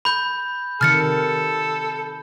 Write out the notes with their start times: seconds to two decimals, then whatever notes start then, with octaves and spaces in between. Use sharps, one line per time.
0.05 B5 G6
0.81 C3 D#3 A4 F6 A6 C#7